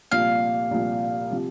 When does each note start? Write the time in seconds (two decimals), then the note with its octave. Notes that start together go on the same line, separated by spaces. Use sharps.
0.12 C2 A#2 F3 F5
0.71 C2 A#2 F3
1.31 C3 F3